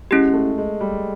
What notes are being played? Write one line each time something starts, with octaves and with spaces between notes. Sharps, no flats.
G#3 C#4 E4 G4
A3
G#3
G3